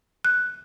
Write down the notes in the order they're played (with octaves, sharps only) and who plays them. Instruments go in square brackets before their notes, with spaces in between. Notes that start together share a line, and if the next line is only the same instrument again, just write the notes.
[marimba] F#6